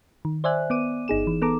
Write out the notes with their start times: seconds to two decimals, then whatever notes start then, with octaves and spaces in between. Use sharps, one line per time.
0.25 D#3
0.44 C5 D5 E5 G#5 F#6
0.70 B3 D6 D#7
1.08 G1 D#4 G#4 E7
1.27 E3
1.42 B3 A4 A#5 D6